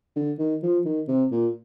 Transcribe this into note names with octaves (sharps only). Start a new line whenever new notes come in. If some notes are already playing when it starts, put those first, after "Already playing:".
D3
D#3
F3
D#3
C3
A#2